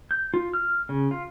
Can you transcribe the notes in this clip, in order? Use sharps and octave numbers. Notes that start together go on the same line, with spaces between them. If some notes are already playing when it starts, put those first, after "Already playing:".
G6
F4
F6
C#3
F4